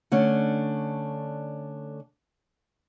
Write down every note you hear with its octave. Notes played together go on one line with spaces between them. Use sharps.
D3 A3 C#4 D4